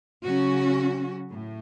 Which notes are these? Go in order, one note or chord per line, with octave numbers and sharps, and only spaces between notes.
C#3 F#3 C#4 F#4
A2